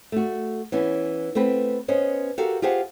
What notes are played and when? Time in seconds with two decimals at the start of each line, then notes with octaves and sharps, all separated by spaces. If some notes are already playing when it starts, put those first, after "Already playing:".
0.12 A3 F#4
0.72 E3 B3 C#4
1.35 A3 B3 C4 B4
1.88 B3 C#4 C5 D#5
2.38 F#4 G4 A4 A#4 F5 F#5
2.62 F4 G4 G#4 C5 F#5